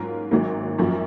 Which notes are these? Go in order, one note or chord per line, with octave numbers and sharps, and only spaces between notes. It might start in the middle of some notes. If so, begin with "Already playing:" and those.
Already playing: G#2 F#3 C#4 F4 A#4
G#1 G#2 F#3 A#3
G#1 F#2 F3 A#3